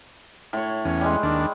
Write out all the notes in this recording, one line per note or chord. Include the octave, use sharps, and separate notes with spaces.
A2 C#5
E2 C#4
G3 G#3
D#2 D4